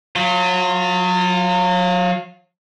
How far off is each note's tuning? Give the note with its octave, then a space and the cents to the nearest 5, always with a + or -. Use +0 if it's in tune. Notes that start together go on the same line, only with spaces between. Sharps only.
F#3 -30 F4 +0